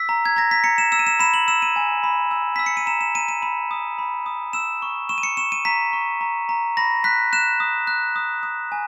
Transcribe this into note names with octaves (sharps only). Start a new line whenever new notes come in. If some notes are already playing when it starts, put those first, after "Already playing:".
Already playing: E6 B6
A#5
G#6
A#5 A#6
B6
A#5 C#7
E7
E6 E7
D#7
E7
B5 E7
F#7
E6 E7
D#7
G#5
B5
E6
E6 B6
C#7
D#7
A#5 E7
E7
A#5 D#7
D#7
B5 D#7
D#6
B5
D#6
E6 E7
C#6
C#6 E7
D#7
C#7
C#6 E7
D#7
A#5 B6
C#6
A#5
A#5
B5 A#6
F#6 B6
F#6 E7
D#6
F#6
D#6
D#6
G#5